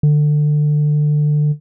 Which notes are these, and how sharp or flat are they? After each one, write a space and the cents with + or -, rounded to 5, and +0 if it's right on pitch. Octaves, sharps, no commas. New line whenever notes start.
D3 +25